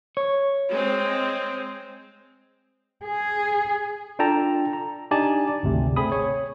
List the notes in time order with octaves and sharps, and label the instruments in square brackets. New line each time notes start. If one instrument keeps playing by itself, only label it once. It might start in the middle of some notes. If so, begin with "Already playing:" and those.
[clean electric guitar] C#5
[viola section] G#3 C4
[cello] G#4
[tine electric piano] D4 F4 A4 G5 A5 A#5
A#5
D4 D#4 G4 D5 G#5 A5
G#1 D2 C3
A3 C4 G#4 B5 D#6
C#5